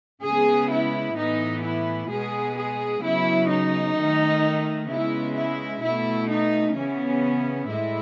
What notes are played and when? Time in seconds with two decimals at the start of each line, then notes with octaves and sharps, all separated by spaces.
0.24 C#3 G#3 B3 G#4
0.71 E4
1.16 A2 E3 B3 D#4
1.63 E4
2.10 B2 G#3 B3 G#4
2.57 G#4
3.03 C#3 F#3 B3 E4
3.49 D#4
3.95 D#3 A3
4.89 C#3 G#3 B3 E4
5.35 E4
5.82 B2 A3 E4
6.28 D#4
6.75 C#3 E3 B3 C#4
7.68 A2 G#3 E4